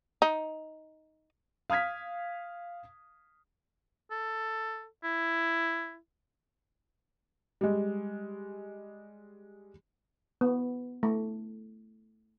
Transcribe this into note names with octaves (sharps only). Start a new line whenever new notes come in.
D#4
F5 D#6 F6 G#6 B6
A4
E4
G3 G#3
B3
A3